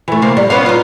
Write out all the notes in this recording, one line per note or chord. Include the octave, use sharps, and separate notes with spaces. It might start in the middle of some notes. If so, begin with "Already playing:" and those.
E3 A3
C3 A#3 F5
G3
B3 C#4 F5
D#4 F4